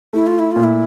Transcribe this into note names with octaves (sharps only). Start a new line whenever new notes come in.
A3 E4
F4
E4
A#2 F4
E4